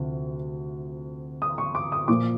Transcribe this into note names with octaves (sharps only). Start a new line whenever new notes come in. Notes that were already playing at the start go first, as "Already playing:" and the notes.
Already playing: D2 C3 F3
D#6
C#6
D6
D#6
A#2 F3 A#3 D6